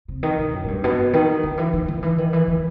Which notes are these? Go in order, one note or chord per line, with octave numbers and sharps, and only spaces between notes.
C3
D#3
B2
F#2
A2
G2
B2
D#3
D#3
E3
D#3
D#3
E3
D#3
E3
D#3